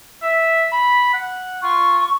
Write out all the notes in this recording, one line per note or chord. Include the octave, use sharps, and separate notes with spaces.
E5
B5
F#5
F4 C#6